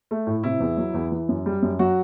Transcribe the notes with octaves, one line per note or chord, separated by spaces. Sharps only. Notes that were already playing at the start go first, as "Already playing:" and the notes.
A3
A2
C3 E4
E2
F#3
E2
E3
F#2
G3
F#2
F#3 F#4